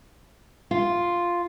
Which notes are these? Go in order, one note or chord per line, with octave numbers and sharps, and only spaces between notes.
F4